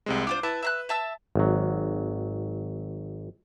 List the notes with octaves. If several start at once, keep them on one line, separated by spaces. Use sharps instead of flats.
C2 C3 G#3
D4 F4 C5 D6
E4 B4 E5 A5
E5 A#5 F#6
E5 A5 E6
G#1 F#3